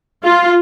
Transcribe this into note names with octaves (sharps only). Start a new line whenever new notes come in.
F4